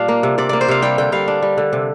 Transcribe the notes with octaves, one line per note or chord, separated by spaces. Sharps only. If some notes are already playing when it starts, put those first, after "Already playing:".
Already playing: A#2 G3 D4 D5 F5
A#3
C3
C3 D5
A#3 D5
C5
C3 F5
G3 G5
D3 G5
G3 F5
D4
G3
D3
C3